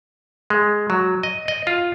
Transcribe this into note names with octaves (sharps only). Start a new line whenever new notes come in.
G#3
F#3
D#5
D#5
F4